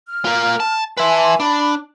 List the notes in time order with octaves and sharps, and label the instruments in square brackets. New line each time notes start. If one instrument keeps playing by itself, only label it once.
[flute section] F6
[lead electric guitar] F4 A#4
A5
[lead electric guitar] B4 E5 [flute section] G#5 A5 C6
[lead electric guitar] D4 [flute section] B5